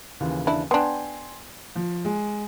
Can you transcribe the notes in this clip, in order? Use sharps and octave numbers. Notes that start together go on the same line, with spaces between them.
D#2 C#3 E3
D4 E4
B3 D4 G5 G#5 C6
F3
G#3